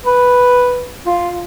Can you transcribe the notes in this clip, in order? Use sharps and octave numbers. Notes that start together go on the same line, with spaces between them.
B4
F4